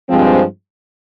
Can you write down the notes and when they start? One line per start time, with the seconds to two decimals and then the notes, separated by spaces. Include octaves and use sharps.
0.08 G2 F3 G#3 C4